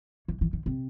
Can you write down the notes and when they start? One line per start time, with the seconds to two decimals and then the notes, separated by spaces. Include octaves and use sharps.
0.28 E3
0.41 E3
0.53 D#3
0.66 C3